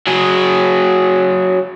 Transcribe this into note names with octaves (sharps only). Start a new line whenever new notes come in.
F#3 G#4